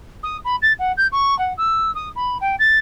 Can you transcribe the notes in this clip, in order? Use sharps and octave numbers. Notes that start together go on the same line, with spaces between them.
D#6
B5
A6
F#5
G6
C#6
F#5
E6
D#6
B5
G5
A6